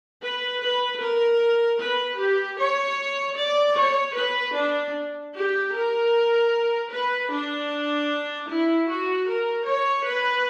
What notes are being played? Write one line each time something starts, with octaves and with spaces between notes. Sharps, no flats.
B4
B4
A#4
B4
G4
C#5
D5
C#5
B4
D4
G4
A#4
B4
D4
E4
F#4
A#4
C#5
B4